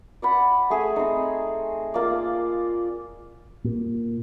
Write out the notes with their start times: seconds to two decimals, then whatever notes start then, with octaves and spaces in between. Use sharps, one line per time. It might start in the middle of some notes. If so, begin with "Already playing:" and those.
0.22 D5 F#5 B5
0.70 A3 G#4 E5 G#5
0.96 C4 D#4
1.94 A#3 F4 D5
3.65 A#2